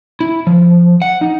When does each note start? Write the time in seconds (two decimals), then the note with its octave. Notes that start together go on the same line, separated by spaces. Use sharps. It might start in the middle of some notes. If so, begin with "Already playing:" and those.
0.21 E4
0.47 F3
1.02 F#5
1.21 D#4